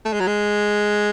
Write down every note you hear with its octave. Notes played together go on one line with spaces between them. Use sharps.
A3
G#3
F#3
G#3